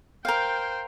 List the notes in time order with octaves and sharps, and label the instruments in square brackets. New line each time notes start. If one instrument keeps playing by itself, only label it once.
[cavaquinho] A#4 F5 [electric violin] C5 G5